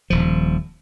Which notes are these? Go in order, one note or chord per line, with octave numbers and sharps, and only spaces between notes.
D#1 F3